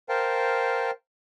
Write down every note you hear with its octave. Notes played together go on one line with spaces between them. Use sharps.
A#4 C5 F5 G5 A5